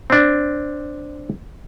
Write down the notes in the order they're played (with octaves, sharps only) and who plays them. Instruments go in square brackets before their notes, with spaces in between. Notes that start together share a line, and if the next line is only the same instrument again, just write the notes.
[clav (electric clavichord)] C4 D4